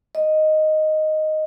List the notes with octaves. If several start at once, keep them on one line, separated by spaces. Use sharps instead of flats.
D#5